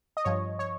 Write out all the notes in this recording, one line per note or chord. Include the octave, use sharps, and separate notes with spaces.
D#5
G2 F3 C#5
C#5